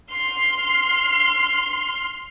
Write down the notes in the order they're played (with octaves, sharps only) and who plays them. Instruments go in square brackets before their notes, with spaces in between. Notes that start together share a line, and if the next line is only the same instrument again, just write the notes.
[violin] C6 F6